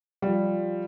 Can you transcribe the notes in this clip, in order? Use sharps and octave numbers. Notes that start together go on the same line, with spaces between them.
F3 G3